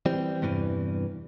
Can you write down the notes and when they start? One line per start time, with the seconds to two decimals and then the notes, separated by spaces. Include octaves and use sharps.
0.06 E3 G3 C4
0.42 E2 G2 C3 E3